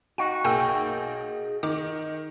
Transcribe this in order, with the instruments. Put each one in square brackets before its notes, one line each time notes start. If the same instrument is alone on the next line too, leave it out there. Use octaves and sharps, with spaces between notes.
[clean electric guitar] D#4 F#4 [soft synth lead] F5 [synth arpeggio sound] G5
[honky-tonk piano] B1 A#3 G6 [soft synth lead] G#4 [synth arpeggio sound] G5 G#5 E6
[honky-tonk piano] D#3 [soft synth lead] D#5 [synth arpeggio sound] D6